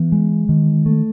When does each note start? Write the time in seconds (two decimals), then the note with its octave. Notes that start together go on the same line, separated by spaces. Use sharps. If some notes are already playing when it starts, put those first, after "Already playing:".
Already playing: E3 B3
0.12 G#3
0.49 D#3
0.86 A3